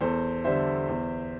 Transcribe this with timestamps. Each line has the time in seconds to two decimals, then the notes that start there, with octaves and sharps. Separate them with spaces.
0.01 E2 A4 C5
0.44 D3 G3 C5 E5
0.88 E2